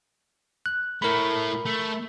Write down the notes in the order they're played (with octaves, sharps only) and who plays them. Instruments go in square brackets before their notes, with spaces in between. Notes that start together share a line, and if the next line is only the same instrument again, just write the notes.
[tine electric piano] F#6
[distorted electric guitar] A3 E4 [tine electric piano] A#4 B5
[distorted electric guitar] A3